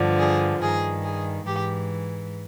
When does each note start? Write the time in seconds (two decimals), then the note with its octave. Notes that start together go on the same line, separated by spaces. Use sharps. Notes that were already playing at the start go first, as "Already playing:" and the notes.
Already playing: G2 D3 F3
0.19 G#4
0.60 G2 D#3 G#4
1.04 G#4
1.45 G#2 E3 G4